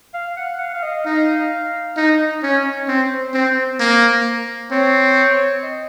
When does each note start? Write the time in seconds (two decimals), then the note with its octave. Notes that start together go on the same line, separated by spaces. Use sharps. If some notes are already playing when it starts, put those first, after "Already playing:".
0.14 F5
0.36 F#5
0.59 F5
0.74 F5
0.83 D#5
1.05 D#4 F5
1.97 D#4 D#5
2.42 C#4 C#5
2.88 C4 C5
3.34 C4
3.80 A#3
4.71 C4 C#5
5.63 D#5